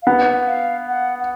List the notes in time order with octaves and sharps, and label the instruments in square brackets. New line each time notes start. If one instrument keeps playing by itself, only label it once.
[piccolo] F5
[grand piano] B3 [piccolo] F#5
[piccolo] F5
F#5
F#5